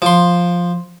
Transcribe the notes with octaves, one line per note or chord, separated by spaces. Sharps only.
F3 C6